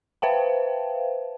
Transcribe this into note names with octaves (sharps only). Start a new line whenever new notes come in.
B4 C5 E5 F5 G5 A5